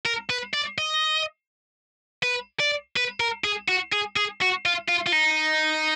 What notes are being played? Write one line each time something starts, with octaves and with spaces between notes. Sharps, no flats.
A#4
B4
D5
D#5
B4
D5
B4
A#4
G#4
F#4
G#4
G#4
F#4
F4
F4
F4
D#4